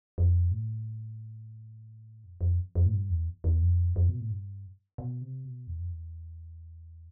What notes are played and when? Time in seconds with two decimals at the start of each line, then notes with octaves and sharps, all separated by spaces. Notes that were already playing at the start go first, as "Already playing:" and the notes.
0.18 F2
0.51 A2
2.24 F2
2.41 F2
2.75 F2
2.86 A2
2.93 G2
3.10 E2
3.44 E2
3.61 F2
3.96 F2
4.09 B2
4.20 A2
4.30 G2
4.98 B2
5.22 C3
5.44 B2
5.67 E2
5.79 F2
5.91 E2